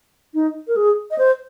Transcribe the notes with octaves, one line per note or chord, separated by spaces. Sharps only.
D#4
A#4
G#4
D#5
C5